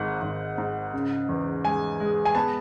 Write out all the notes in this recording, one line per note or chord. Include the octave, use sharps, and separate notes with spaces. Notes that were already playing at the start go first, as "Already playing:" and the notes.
Already playing: G#1 G#2 F#5
G#1
G#2
C#3
E2
G#3 G#5
G#3
G#5
B3 A5